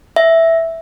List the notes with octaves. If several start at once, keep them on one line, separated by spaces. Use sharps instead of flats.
E5